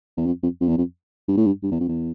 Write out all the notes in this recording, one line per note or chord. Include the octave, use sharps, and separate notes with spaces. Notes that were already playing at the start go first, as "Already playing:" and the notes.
E2
F2
F2
F2
E2
F2
G2
A2
G2
G2
E2
F2
E2